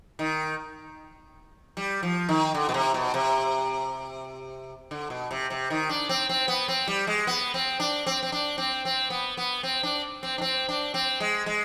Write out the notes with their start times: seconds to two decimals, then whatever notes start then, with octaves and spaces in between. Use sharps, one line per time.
0.19 D#3
1.77 G3
2.03 F3
2.29 D#3
2.54 D3
2.69 B2
2.74 C3
2.94 B2
3.14 C3
4.91 D3
5.10 B2
5.31 C3
5.50 C3
5.70 D#3
5.89 D4
6.09 C4
6.29 C4
6.48 B3
6.68 C4
6.87 G3
7.07 G#3
7.27 B3
7.54 C4
7.80 D4
8.06 C4
8.23 C4
8.32 D4
8.58 C4
8.85 C4
9.10 B3
9.37 B3
9.63 C4
9.83 D4
10.23 C4
10.38 D4
10.42 C4
10.69 D4
10.94 C4
11.20 G#3
11.46 G#3